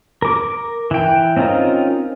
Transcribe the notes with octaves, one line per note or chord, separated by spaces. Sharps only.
A#4 D6
E3 G5
C4 C#4 D#4 F4 A#4